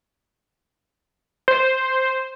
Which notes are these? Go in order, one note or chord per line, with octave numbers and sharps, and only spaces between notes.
C5